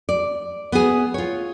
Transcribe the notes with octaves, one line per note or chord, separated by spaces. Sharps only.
D5
B3 G#4
F4 C#5